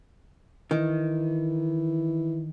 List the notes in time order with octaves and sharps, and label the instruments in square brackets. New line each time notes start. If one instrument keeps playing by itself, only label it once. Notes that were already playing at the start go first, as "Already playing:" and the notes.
[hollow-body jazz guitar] D#3 [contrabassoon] E3